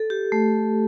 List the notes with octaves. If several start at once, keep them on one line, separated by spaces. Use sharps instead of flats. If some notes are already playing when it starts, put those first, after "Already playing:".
Already playing: A4
G4
A3